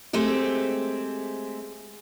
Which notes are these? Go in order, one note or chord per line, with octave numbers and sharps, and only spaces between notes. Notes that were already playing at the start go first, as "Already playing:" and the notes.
G#3 A3 C4 G4